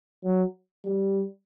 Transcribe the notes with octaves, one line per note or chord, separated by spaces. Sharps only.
F#3
G3